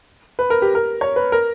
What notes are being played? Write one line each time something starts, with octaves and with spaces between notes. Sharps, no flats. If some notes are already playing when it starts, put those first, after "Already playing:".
B4
A#4
G4
A#4
C#5
B4
A#4